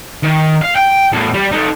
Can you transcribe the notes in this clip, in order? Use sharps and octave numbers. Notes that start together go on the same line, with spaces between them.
D#3
F5
G5
E2 A2
G3
D#4 A4